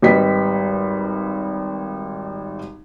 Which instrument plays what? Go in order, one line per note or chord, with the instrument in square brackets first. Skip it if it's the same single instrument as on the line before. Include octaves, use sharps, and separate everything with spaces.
[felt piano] G#1 G3 B4 D#5 B6